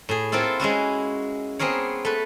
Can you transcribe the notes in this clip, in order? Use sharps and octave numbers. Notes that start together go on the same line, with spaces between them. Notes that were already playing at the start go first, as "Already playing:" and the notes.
A2 G#4
A#3 C4 E4 F4 A4
G#3 C#4 E4 F#4
B3 C4 G#4 A#4 C#5
A3 B4